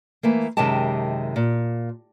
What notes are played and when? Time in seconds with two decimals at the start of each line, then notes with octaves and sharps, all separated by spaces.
0.23 E3 A3 A#3
0.57 F#2 C3 D#3 G#3 G4 A5
1.36 A#2